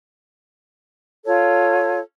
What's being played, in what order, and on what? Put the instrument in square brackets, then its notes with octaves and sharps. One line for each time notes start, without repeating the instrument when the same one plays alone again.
[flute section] F4 A4 C#5